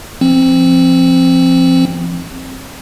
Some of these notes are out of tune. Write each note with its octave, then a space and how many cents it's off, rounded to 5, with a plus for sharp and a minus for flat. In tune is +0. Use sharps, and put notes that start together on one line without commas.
F3 -25 C4 +15